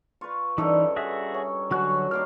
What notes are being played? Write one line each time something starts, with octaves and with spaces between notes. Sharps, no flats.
F4 B4 C#6
G2 C#3 E3 G3 D#4 A4 A#4 D#5
F#4 G#4 E5
C#4
D3 F#3 C#4 F#4 F#6
D#3 A#3 A#4 C6 D6 F6